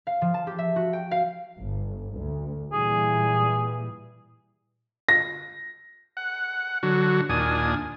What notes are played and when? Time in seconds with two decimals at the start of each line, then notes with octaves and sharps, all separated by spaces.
0.07 F5
0.22 F3
0.34 A5
0.47 G4
0.58 E5
0.76 F#4
0.93 G5
1.11 F5
1.59 G1
2.18 D2
2.73 A#2 E3 G3 G#4
5.09 A#6
6.17 F#5
6.83 D3 F#3 F#4
7.29 D#2 A#2 D4 G#5 D#6